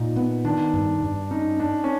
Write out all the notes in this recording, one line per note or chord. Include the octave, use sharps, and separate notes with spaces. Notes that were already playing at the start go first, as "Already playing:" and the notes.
Already playing: A#2 D#4
B3
D#3 D4
G2
G2
C#4 D#4
C#4 D4
C#4